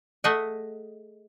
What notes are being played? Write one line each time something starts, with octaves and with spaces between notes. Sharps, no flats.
A3 G#4 D#5 E5 F#5 G#5